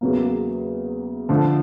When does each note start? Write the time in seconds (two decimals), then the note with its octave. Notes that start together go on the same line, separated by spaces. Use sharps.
0.01 E2 C#3 F#3 A#3
1.29 D3 F3 A3